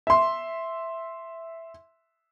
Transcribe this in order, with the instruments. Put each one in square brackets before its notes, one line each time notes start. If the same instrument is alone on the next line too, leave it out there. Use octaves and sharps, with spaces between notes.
[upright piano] E5 C6